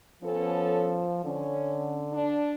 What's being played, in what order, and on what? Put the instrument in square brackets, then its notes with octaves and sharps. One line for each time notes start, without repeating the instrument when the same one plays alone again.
[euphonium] F3 [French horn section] B3 C#4 A4
[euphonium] D3 [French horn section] C#4
[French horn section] D4